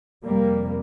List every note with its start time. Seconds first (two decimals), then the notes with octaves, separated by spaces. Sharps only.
0.24 F2 C3 G3 A#3